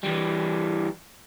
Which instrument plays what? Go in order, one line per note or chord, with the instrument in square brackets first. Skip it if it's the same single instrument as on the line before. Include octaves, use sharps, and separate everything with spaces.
[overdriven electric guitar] E3 G3